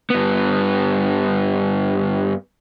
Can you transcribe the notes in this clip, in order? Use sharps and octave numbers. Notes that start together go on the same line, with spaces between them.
G2 B3